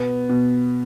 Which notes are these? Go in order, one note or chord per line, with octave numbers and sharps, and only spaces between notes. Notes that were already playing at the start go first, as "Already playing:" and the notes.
Already playing: B2 B3
B2